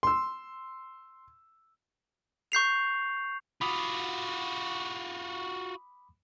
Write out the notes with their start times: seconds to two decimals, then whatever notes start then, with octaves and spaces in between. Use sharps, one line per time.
0.03 C6 E6
2.52 C#6 G6 C7 F7
3.61 F4 F#4 B5 D6 D#6